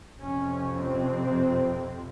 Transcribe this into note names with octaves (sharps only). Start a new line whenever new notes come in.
F2 C3 C#4
C4